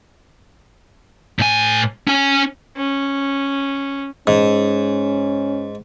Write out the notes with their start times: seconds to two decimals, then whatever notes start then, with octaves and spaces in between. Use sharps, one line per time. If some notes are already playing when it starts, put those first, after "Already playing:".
1.39 A2 G#5
2.07 C#4 G#5
2.76 C#4
4.27 G#2 C#4